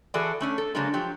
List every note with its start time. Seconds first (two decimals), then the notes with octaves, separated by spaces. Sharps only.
0.14 E3 F#4 G#4 A4 D5
0.40 A3 C#4 D4
0.58 A4
0.75 C#3 F#3 G#3 A#3 D4 A#4
0.94 F3 F#3 G4